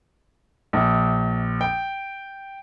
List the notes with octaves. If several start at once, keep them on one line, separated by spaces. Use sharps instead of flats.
A#1
G5